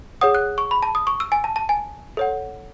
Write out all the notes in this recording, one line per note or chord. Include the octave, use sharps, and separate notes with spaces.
G#4 C#5 F#5 D#6
F#6
C#6
B5
A5
D#6
C#6
E6
G#5
A5
A5
G#5
A4 C#5 F#5